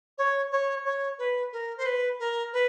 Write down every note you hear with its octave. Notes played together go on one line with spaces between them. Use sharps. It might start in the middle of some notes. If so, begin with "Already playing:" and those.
C#5
C#5
C#5
B4
A#4
C5
B4
A#4
B4